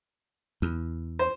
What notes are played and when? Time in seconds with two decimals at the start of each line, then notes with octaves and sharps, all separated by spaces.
0.62 E2
1.19 C5